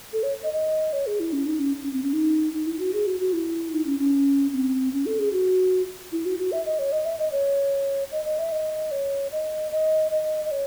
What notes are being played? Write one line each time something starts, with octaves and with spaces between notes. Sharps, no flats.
A4
C#5
D#5
D#5
C#5
G#4
E4
C#4
D#4
C#4
C#4
C4
C#4
D#4
D#4
E4
F#4
G#4
F#4
F#4
E4
D#4
C#4
C#4
C4
C#4
A4
G#4
F#4
E4
F#4
F#4
E5
D#5
C#5
D#5
E5
D#5
C#5
D#5
D#5
E5
D#5
C#5
D#5
D#5
D#5
D#5
C#5